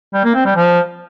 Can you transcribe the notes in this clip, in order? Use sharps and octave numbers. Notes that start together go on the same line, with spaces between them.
G3
A#3
C4
G3
F3